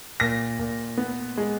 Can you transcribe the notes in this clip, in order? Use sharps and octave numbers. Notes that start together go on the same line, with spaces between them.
A#2 A#6
A#2
B3
G#3